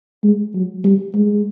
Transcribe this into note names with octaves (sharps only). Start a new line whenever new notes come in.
G#3
F#3
G3
G#3